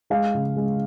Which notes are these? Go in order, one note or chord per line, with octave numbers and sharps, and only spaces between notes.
G#3 F5
C#3
G#3